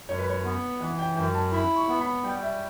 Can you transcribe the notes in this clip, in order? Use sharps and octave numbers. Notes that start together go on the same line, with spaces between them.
F#2 C#5
B4
C#5
B3
E3 F#5
G5
F#2 G5
A5
E4 B5
C#6
B3
B5
G3 G5
E5